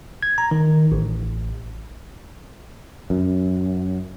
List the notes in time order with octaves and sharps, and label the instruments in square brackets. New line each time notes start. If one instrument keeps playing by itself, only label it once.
[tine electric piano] G#6
A#5
D#3
A1
[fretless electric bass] F#2